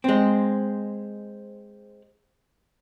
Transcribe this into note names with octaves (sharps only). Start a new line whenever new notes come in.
G#3 C4